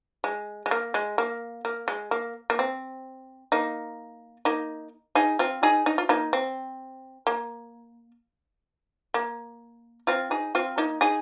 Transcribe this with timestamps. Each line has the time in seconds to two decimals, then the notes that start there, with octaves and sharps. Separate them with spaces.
0.24 G#3
0.66 G#3
0.71 A#3
0.94 G#3
1.18 A#3
1.65 A#3
1.88 G#3
2.11 A#3
2.50 A#3
2.59 C4
3.52 A#3 D#4
4.45 A#3 D#4
5.15 D#4 G#4
5.39 C4 F4
5.63 D#4 G#4
5.86 D#4
5.98 F4
6.09 A#3 D#4
6.33 C4
7.27 A#3
9.14 A#3
10.07 C4 F4
10.31 D#4 G#4
10.55 C4 F4
10.78 A#3 D#4
11.01 D#4 G#4